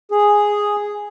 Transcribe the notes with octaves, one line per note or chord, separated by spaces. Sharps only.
G#4